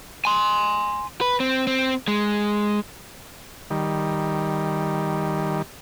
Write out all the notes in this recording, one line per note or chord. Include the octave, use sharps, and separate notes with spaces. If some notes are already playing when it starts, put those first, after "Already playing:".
G#5 C6
B4
C4
C4
G#3
D#3 G3